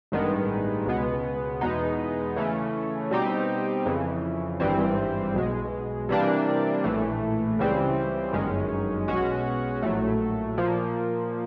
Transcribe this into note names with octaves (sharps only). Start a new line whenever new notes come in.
A1 G2 D#3 G#3 B3
C#2 B2 G#3 B3
E2 B2 G#3 B3 D#4
C#3 E3 A3 C#4
B2 G3 C4 D#4 G4
F2 C#3 E3
G#1 G2 E3 G3 C4
B1 B2 G#3
C3 E3 G3 A#3 D4
A#1 A2 E3 A3
C#2 C#3 E3 G3 C4
G1 F#2 D#3 G#3 C#4
B1 B2 G#3 C#4 F#4
A#1 A2 F#3 A3
A#2 F3 A#3